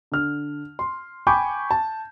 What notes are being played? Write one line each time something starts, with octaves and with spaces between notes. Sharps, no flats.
D3 F6
C6
G5 G#5 B5 C#6 D6 G6
A5